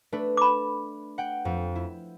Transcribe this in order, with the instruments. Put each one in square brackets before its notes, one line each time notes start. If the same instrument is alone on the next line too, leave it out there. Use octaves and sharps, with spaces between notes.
[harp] A3 D4 B4
[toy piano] B5 D6
[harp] F#5 G5
F2
E4